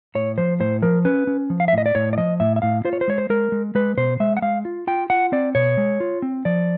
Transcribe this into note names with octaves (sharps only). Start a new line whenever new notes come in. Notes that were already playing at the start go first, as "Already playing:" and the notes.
A2 C#5
F3 C5
A2 C5
F3 A#4
C#4 B4
C#4
F3
F5
E5
A2 D#5
D5
A2 C#5
D5
F3 D#5
A2 E5
E5
A2 F5
F4 C5
C#5
C5
G#3 C#5
C5
G#3 A#4
G#3
G#3 B4
B2 C5
G#3 E5
F#5
G#3 F5
F4
F4 G5
F4 F#5
C4 D5
B2 C#5
G#3
F4
C4
F3 D5